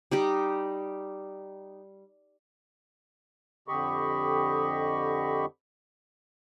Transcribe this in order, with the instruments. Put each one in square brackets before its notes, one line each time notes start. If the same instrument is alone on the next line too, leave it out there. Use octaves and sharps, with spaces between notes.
[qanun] G3 D#4 G4
[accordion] F2 D3 G4 D#5 B5 C#6